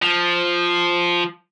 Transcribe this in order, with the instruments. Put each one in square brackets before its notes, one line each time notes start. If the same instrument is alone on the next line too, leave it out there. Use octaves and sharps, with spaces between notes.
[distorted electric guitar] F3